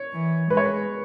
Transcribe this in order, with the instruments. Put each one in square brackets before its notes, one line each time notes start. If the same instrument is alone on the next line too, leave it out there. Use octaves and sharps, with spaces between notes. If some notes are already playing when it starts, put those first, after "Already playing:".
Already playing: [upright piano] C#5
[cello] E3
[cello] G#3 [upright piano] B4
[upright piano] C#5
B4